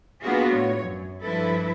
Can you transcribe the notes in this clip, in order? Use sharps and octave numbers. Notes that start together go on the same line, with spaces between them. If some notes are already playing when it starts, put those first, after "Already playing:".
A#3 B3 D4 F4 F#4 G#4
A2 C#5
F#2
G2 F3 E4 A4 B4